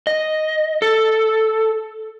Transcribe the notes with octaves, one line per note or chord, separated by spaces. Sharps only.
D#5
A4